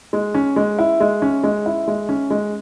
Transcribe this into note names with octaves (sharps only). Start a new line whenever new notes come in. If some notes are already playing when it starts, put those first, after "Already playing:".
G#3
C#4
G#3
E4
G#3
C#4
G#3
E4
G#3
C#4
G#3